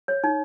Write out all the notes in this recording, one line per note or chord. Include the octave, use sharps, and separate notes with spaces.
C#5
D#4